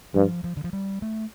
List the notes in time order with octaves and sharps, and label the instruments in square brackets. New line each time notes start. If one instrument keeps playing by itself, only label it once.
[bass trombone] G2 [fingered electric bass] F3
[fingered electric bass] F3
D3
F3
G3
A3